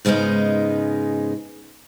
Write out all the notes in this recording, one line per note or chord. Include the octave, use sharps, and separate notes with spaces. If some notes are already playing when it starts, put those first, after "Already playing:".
G#2 C#3 G#3 B3 D#4